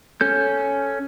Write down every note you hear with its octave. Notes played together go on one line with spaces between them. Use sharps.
C#4 A4 G6